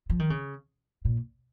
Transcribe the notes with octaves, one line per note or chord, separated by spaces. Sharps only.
F3
D#3
C#3
A#2